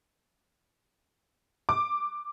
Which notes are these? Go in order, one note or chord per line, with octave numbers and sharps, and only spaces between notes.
D6